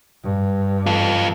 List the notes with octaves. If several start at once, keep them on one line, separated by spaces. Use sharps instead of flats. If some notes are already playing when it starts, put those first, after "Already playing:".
G2
F4 A4